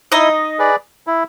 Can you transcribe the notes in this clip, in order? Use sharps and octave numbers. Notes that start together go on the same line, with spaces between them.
D#4 E4 D#5
G#4 B4 D5
E4